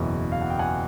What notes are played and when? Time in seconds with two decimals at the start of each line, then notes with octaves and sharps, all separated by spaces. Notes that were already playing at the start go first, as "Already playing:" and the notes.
Already playing: F#1 E2 B2
0.32 F5
0.41 F#5
0.50 G5
0.59 F#5 G#5